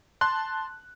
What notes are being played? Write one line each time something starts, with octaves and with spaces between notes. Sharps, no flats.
A5 C6 F#6